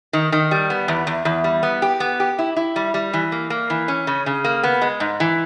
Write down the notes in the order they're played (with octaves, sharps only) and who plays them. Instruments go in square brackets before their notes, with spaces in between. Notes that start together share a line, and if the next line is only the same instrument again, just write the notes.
[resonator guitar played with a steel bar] D#3
D#3
G3
B3
E2
E2
E2
G3
B3
G4
B3
G4
E4
E4
G3
G3
E3
A#3
A#3
E3
C#4
C#3
C#3
A#3
B3
G#3
G#2
E3